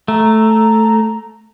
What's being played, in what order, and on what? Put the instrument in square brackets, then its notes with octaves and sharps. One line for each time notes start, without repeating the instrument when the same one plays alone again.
[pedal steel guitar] A3 [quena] A#5